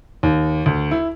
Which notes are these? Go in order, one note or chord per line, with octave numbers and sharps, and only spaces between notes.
D#2
D2
E4